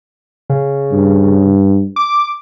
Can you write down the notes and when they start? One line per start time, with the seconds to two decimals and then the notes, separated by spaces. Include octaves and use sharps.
0.50 C#3
0.92 G2
1.96 D6